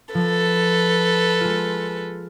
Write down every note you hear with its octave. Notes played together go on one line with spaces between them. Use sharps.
F3 A4 B4
G#3 F4